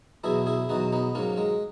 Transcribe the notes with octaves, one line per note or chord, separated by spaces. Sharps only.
E2 B2 F#3 E4 G#4
E4 G#4
E2 B2 F#3 D#4 F#4
B3 D#4
G#2 F#3 A#3 C#4
G#3